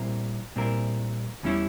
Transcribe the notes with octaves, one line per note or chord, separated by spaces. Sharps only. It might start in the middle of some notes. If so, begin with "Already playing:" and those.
Already playing: A#2 G3 C4 E4 A#4
A#2 G3 C4 E4 A#4
E2 E3 G3 C#4 E4